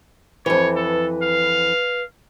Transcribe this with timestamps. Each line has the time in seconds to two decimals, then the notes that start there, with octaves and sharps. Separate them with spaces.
0.46 F2 E3 C#5
0.76 A4 B4
1.22 F5